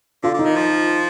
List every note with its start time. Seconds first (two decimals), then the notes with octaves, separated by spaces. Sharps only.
0.23 D3 F4
0.34 D3
0.39 D#4
0.45 D#3
0.56 F3